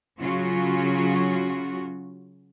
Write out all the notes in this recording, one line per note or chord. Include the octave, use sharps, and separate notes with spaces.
C#3 F#3 C#4 F4 F#4